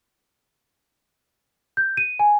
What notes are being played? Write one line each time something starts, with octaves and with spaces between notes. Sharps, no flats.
G6
D#7
G#5